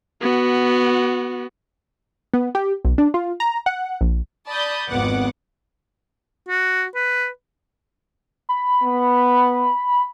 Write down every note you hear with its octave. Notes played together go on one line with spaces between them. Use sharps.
B3 F#4
B3
G4
B1
D4
F4
A#5
F#5
A#1
D5 A5 B5 D#6 G6
G#1 F2 B3 F#5 D6
F#4
B4
B5
B3